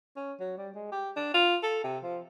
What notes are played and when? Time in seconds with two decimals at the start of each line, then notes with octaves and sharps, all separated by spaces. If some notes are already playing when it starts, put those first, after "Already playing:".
0.16 C#4
0.40 F#3
0.58 G3
0.75 G#3
0.92 G4
1.16 D4
1.34 F4
1.63 A4
1.84 C3
2.03 F3